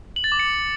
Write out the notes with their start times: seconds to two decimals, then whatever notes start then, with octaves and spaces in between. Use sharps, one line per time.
0.16 F#7
0.24 A6
0.32 D6
0.39 C#7